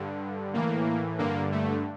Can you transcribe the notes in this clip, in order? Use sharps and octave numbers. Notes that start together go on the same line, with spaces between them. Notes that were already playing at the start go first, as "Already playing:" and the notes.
Already playing: G2 D3
A2 E3 A#3
G2 D3 A#3
A3